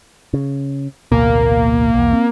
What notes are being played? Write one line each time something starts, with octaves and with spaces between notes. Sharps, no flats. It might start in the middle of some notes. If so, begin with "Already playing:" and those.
C#3
A1 D2 B2 A#3
B1 E2
C4